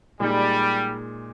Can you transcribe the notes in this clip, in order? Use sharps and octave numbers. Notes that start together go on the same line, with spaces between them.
A#2 G3 G#3 D#4 G#4